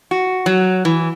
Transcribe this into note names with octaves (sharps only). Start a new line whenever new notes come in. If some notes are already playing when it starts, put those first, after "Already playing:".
F#4
F#3
E3